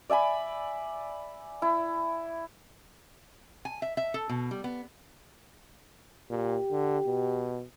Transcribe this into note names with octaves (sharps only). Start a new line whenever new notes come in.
D5 E5 G#5 B5
E4
G#5
E5
E5
A4
B2
G3
B3
A#2 G4
D3
B2